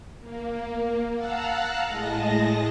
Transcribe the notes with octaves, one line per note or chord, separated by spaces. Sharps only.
A#3
F5 F#5 A5 A#5 E6 F#6
A2 G#3 G#4 D#5 A5 A#6